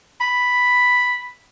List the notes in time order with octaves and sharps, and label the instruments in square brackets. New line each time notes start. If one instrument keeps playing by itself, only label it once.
[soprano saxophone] B5